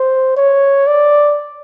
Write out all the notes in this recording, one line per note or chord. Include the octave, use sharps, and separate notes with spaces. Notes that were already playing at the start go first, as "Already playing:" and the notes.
Already playing: C5
C#5
D5